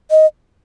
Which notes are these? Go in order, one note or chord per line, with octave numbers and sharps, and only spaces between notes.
D#5